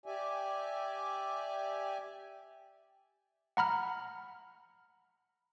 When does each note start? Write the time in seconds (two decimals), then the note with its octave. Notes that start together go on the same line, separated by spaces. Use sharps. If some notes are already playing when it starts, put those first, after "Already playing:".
0.06 G4 D5 E5 G#5
3.57 F#5 A#5 B5 F6